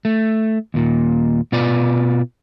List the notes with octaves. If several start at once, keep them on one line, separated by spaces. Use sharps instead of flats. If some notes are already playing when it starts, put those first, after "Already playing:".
A3
D#2 A#2
B2 F4 B4 D5